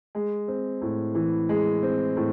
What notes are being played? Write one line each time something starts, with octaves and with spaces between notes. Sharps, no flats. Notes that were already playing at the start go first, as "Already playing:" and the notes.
G#3
C4
A2
E3
G#3
C4
A2